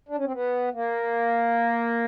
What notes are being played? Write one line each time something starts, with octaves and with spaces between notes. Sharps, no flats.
D4
C#4
C4
B3
A#3